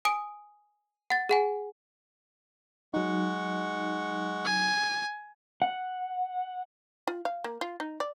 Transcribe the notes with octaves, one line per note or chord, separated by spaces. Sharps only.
G#5 D#6 D7
F#5 A6
G#4 F#5 G#5
F#3 G#3 D#4 F#5 C#6
G#5
F#5
F4
F5
A#3
F4
D#4
D5